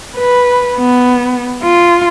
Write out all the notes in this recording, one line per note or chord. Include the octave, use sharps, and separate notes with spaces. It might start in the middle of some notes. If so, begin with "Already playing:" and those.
B4
B3
F4